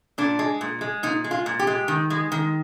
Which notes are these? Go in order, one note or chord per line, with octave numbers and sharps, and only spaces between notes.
A#2 D4
G#3
A#2
G#3
A#2 D#4
G#3
F4
A#2
G4
G#3
D#3
G#3
D#3